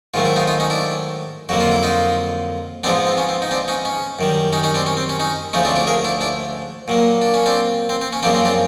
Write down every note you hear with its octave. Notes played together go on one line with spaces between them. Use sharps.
G#2 D#3 F#3 A3 F4
E4
D#4 F4
D#4 F4
C#4 D#4
D4 E4
F2 D3 F#3 A#3 F#4
F4
E4
D#4 F4
G#2 F3 G#3 B3 C4 D4
C4
C#4
C4
D#4
C4 D4
C#4 D#4
C#4
F#2 D#3 G3
C#4 D#4
C#4 D#4
C4 D4
C#4
C4
C#4
C#4 D#4
D2 C#3 F3 A3 C#4 D#4
C4 D4
D4 E4
G#4 A#4
D4 E4
D4 E4
A#2 F#3 A#3
D4
C#4
C4 D4
C4
C4
C#4
F#2 C#3 F3 A#3 C4 D4
C4
C4 D4